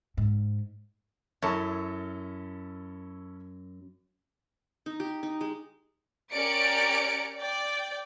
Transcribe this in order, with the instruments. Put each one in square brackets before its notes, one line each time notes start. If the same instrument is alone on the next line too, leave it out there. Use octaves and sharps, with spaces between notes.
[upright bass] G#2
[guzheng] F#2 [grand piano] C#4 E4 A4
[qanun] D#4
G4
D#4
G#3
[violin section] C#4 G4 A#4 D5 C#7 D7
D5 G5